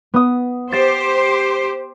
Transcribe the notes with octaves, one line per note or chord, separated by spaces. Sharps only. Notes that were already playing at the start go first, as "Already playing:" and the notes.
B3 D#6
G4 C5 A6 E7